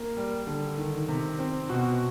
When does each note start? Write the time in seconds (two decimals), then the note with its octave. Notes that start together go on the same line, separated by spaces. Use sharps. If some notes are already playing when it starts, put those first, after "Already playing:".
Already playing: A#3
0.17 G3
0.47 D3
0.78 D#3
1.08 C3
1.39 C4
1.69 B2 F#4